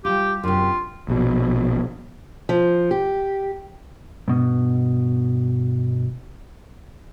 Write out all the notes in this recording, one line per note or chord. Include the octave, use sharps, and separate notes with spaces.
G3 F4 G4
F#2 C3 F4
A#1 B2
F3
G4
G2 B2